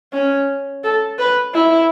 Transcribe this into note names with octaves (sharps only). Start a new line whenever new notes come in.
C#4
A4
B4
E4